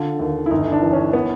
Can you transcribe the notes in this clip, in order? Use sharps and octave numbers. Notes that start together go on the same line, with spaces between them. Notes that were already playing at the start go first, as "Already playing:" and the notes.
Already playing: D3 F4
D#2
E4
G1 D#4
D4
E3
C#4
B3